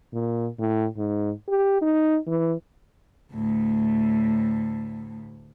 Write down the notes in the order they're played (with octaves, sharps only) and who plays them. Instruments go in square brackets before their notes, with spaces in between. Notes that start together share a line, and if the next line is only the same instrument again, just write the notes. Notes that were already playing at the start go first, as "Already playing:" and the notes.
[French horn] A#2
A2
G#2
G4
D#4
E3
[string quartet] D2 A2